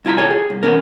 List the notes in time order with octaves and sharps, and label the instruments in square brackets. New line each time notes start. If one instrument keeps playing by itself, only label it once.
[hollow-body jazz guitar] C2 E4 F4 A#5 B5
G4 A4 C#5 G#5
G#4
C2
E3 F3 B3 C#4 A#4